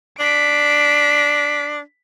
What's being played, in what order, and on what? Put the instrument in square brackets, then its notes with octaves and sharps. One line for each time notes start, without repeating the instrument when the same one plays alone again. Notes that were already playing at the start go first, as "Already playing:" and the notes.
[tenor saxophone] D4 [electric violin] B6 D7